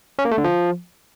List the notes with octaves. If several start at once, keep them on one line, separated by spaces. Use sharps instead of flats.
C#4
A#3
A3
D3
F3